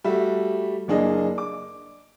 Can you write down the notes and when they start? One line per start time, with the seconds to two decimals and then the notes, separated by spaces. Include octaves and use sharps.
0.04 G3 A3 F#4 E5
0.88 F#1 A#3 D4 G#4 D#5
1.38 D6